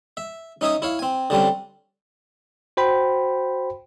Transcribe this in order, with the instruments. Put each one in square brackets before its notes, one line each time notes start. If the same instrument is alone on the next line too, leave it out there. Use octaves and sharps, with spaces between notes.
[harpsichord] E5
C#4 D#4 E5 G#5 D#6
E4 C#5 F5
C4 G#5
D3 G3 C4 C#4
[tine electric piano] F#4 C5 G5 B5